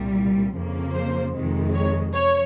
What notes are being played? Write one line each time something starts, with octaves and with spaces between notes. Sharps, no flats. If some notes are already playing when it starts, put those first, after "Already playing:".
Already playing: C2 A#2 G3
F2 C#3 F3 A#3
C5
F2 C3 D#3 G#3
C#5
F3 C#5